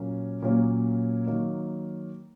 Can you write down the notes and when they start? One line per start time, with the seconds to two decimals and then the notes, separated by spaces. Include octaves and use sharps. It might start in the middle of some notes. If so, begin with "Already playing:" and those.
Already playing: A#2 F#3 A#3 C#4
0.42 A#2 F#3 A#3 C#4
1.26 D#3 F#3 A#3